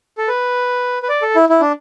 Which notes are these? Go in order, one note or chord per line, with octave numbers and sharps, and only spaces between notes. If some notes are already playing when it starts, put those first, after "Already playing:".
A4
B4
B4
D5
A4
E4
E4
D4